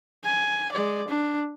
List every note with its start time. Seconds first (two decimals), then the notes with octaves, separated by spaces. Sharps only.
0.25 G#5
0.72 G#3 D5
1.08 D4